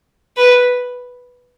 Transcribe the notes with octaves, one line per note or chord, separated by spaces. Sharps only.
B4